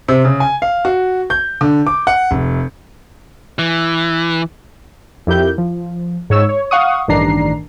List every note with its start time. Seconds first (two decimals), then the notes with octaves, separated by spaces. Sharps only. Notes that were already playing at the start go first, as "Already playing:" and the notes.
0.08 C3
0.25 C#3
0.40 G#5
0.62 F5
0.85 F#4
1.30 G6
1.61 D3
1.87 D6
2.07 F#5
2.31 F1
3.59 E3
5.27 F2 E4 G4 A#4 G6
5.58 F3
6.30 G#2 C#5 E6
6.49 C#5
6.71 F5 F#5 C#6 D#6
7.08 A1 G2 D#3 D4 A#5 C7